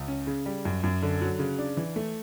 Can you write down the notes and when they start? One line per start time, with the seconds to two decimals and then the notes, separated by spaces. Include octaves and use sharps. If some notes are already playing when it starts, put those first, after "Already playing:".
Already playing: C#2
0.08 C#4
0.27 C#3
0.46 G3
0.65 F#2
0.83 F#2
1.02 D3
1.21 F#3
1.39 C#3
1.59 D4
1.77 E3
1.96 A3